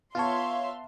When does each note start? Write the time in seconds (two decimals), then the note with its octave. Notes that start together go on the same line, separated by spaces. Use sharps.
0.15 B3 F4 C#5 E5 F5 A5 C6